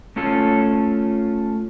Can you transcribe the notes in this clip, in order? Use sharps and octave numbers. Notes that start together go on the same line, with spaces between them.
A3 C#4 F4 A4